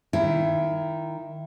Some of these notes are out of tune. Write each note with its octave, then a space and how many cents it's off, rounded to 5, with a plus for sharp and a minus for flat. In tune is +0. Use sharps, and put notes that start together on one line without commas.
D#3 +0 E4 +20